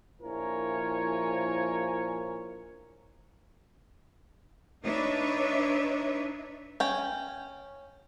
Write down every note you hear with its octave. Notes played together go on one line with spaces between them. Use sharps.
A#1 F3 E4 A#4 C#5 G#5
D4 D#4 B4 C#5 D#5 E5
C#4 G5